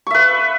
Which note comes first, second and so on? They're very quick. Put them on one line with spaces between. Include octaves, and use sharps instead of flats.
C#6 E5 B4